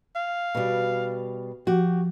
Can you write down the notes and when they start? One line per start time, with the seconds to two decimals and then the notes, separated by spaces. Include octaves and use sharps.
0.15 F5
0.55 B2 G3
1.67 F3 F#4 G4